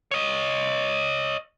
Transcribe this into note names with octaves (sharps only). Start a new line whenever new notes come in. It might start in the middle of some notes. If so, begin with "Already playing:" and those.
C#5 D#5